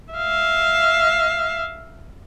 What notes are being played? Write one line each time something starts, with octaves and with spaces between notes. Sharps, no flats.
E5 F5